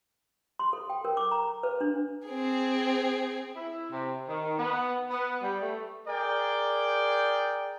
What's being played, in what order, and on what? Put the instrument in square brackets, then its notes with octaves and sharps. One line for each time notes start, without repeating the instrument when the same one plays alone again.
[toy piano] C6
A4
G5
A#4
D6
A#5
B4
D4
[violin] C4 G#4
[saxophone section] E4
C3
D#3
B3
B3
G3
A3
[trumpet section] G#4 A#4 D5 G5